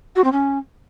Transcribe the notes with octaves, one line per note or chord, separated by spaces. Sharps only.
F#4
C4
C#4